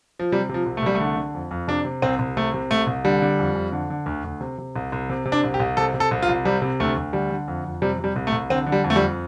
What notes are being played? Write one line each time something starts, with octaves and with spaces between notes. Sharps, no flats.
F3
C3 G3
C3 F3
C2
A3
C2 G3
A3
D3
D3
F2
F2
C3 D4
C3
C2 C4
C2
C3 A3
C3
C2 A3
C2
D3 G3
D3
F2
F2
D3
D3
D2
D2
C3
C3
C2
C2
C3
C3
D4
C2
G4
C2
C3 A4
C3
A4
C2
F4
C2
C3 G3
C3
D2 A3
D2
D3 G3
D3
F2
F2
C3 G3
C3
G3
C2
A3
C2
D3 C4
D3
G3
F2
A3
G3
F2